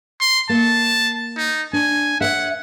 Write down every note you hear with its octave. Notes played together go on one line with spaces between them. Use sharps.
C6
A#3 A5
D#4
D4 G#5
C#5 E5 F#5